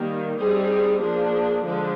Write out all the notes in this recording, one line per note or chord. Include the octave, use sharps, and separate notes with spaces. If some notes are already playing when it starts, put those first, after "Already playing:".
Already playing: D#3 G3 A#3
G3 C4 D#4 G#4
F3 A#3 D4 G#4
D3 F3 G#3 D4